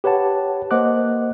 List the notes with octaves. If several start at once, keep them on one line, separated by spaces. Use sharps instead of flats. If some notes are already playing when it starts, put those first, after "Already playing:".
G4 B4 C#5 F#5 A5
A#3 C5 D#5 F#5 D6 F#6